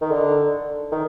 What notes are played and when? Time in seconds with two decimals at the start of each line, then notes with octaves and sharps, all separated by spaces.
0.02 D#3
0.11 D3
0.92 D#3